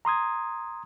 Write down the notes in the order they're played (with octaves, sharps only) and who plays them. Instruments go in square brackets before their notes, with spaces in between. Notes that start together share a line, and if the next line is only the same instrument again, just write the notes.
[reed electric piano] A#5 C6 D#6 G#6